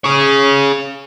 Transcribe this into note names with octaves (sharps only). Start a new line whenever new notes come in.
G#4 C#5